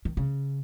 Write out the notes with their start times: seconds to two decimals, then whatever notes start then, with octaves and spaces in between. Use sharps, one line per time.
0.05 D#3
0.17 C#3